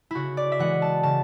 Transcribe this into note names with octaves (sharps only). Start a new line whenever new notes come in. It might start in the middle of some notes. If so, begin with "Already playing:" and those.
C#3 E4 F#4
D5
E5
E3 G#3 F#5
A5
C#3 A5